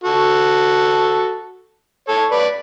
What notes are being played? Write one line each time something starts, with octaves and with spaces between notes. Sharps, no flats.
F#4 A4
A4 C#5
B4 D5